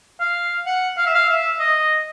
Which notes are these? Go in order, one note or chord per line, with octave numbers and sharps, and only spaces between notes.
F5
F#5
F5
E5
F5
E5
D#5